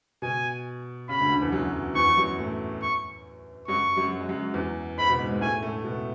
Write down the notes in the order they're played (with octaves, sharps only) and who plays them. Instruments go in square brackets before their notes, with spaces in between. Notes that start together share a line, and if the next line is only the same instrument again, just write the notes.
[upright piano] B2 [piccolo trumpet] G#5
[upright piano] C#3 [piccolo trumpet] B5
[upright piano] D2 D3
D2 D3
E2 E3
F#2 F#3
[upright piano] E2 E3 [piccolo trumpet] C#6
[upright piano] E2 E3
F#2 F#3
A2 A3
[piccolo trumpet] C#6
[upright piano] F#2 F#3 [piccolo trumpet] C#6
[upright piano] F#2 F#3
F#3
G#3
F#2 F#3
E2 E3
[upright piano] G#2 G#3 [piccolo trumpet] B5
[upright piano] B2 B3
G#2 G#3
G#2 G#3
[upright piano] A2 A3 [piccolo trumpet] G#5
[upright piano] A2 A3
B2 B3